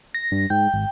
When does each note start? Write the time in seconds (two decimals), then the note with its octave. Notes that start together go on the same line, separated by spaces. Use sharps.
0.14 A#6
0.32 G2
0.50 G#2 G5
0.74 G#1